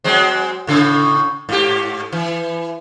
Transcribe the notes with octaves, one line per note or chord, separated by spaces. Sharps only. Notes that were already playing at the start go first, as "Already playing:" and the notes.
F#3 G#3 C4
A2 C#3 A4
G#2 G4
E3